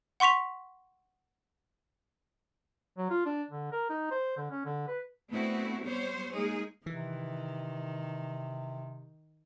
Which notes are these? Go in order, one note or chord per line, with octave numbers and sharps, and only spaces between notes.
F#5 C6 C#6 B6 F7
F#3
F4
D4
D3
A#4
D#4
C5
D3
C#4
D3
B4
A3 B3 C4 D4 E4 F#4
G3 B3 C5 C#5
G#3 A#3 D#4 G#4
C3 D#3 E3